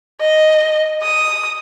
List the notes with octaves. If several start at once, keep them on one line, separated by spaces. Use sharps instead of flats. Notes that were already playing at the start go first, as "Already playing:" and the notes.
D#5
D#6